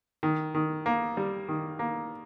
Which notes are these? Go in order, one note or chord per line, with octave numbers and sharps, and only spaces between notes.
D#3
D#3
A#3
G3
D#3
A#3